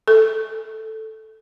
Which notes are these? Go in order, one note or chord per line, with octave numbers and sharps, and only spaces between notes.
A4